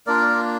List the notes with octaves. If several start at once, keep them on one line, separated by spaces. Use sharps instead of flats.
A#3 D4 F4 A#4 D5